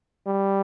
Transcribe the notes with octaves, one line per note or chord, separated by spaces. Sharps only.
G3